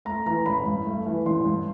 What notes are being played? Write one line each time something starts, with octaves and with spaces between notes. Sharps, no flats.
A3 A#5
E3 A#5
A1 B5
G2
A3
E3
A1 C6
G2